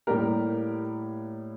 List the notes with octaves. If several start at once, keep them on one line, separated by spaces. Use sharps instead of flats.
A2 G3 A#3 G4 A#4